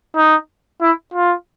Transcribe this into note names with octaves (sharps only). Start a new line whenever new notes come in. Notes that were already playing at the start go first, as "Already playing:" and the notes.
D#4
E4
F4